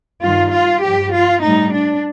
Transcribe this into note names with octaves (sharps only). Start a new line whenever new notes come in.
G2 D#3 G3 F4
F4
G2 F3 G4
F4
A2 G3 D#4
D4